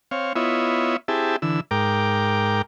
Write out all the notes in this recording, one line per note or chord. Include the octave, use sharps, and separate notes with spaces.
C4 C#5 F5
B3 E4 F4 C#5 D#5 E5
C4 E4 G4 G#4 E5 A5
D3 E3 E6
G#2 A#4 G5 D6